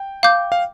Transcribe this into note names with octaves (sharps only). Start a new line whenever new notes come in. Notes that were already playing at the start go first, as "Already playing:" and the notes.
Already playing: G5
F5 D6 G6
F5